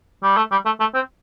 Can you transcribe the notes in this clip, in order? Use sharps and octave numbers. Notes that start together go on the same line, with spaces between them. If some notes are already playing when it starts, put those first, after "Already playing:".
G3
A3
G3
A3
A3
C4